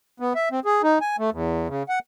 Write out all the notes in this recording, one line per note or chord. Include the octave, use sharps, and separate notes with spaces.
B3
E5
C4
G#4
D#4
G#5
A3
E2
C#3
F#5